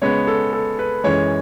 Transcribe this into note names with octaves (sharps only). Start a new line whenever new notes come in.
C#3 G#3 B3 C#5
A4
A4
B4
F#2 E3 G#3 C#5